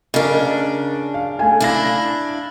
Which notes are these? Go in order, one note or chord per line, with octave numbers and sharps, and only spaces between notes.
C#3 D4 A#4 D#5
F5
A3 G#5
D4 E4 F5 A#6